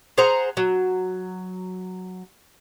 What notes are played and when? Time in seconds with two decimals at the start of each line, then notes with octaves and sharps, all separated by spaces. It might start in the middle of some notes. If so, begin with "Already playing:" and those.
0.18 G#4 C5 F#5 A#5
0.57 F#3